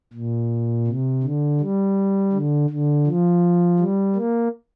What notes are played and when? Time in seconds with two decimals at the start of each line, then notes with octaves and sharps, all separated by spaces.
0.14 A#2
0.87 C3
1.23 D3
1.60 G3
2.33 D3
2.70 D3
3.06 F3
3.79 G3
4.16 A#3